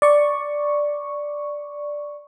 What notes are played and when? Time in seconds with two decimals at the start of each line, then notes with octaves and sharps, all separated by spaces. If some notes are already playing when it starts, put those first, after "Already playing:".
0.02 D5 C#6